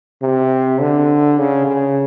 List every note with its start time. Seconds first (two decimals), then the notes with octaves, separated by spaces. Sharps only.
0.22 C3
0.80 D3
1.38 C#3
1.66 C#3